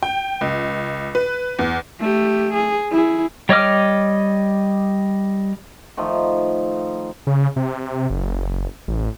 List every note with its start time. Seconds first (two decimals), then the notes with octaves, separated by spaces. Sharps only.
0.03 G5
0.41 C#2
1.15 B4
1.59 E2
1.99 A3 G4
2.54 G#4
2.91 E4 G#4
3.49 G3 C#5 D#5 D6 F6
5.97 D#3 F3 A3
7.27 C#3
7.56 C3
8.10 F#1
8.88 A1